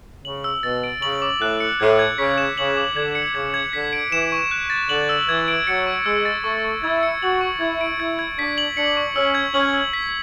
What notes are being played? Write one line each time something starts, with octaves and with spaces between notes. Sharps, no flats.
C#3 F#7
E6
B2 A6
D7
C#3 F#7
D6
A2 F#6
C#7
A2 G#6
G#6
C#3 B6
E7
C#3 F#7
D6
D3 G#6
C#7
C#3 G#6
G#6
D3 B6
D7
E3 E7
C#6
F#6
A6
D3 F#7
E6
E3 G#6
D7
F#3 C#7
C#6
G#3 E6
A6
A3 C#6
C#6
E4 G#6
C#7
F#4 F#7
C#6
E4 G#6
D7
E4 G#6
G#6
D4 B6
F#7
D4 C#7
C#6
C#4 E6
G#6
C#4 F#7
E6
B6